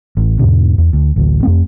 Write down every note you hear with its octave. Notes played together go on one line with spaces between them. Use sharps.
A1
E2 G#2 B2 D3
E2
D2
A1 D2
F2 A3 C4